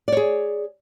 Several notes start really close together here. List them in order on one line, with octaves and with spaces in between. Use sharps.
D5 C#5 G#4